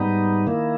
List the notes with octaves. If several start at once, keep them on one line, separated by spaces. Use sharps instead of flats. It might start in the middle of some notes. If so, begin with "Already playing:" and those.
Already playing: G#2 G3 B3 D#4
D#3 A#3 E4